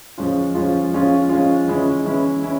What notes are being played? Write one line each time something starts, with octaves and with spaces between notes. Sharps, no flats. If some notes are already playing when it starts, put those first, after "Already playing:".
F3 G#3 C#4 F4
F3 G#3 C#4 F4
F3 G#3 C#4 F4
F3 G#3 C#4 F4
E3 G#3 C#4 E4
E3 G#3 C#4 E4
C#4 E4